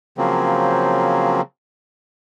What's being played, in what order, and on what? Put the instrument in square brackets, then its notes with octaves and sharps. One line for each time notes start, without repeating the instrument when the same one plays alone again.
[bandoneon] C#3 F3 F#3 A#3 C4